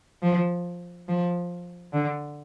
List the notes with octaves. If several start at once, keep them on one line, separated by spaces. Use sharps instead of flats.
F3
F3
D3